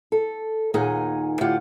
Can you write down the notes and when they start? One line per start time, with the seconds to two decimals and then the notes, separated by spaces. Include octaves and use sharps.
0.12 A4
0.74 D#2 A#2 D#4 G#4 F#5 G#5
1.41 A2 D3 F4 G4 F#5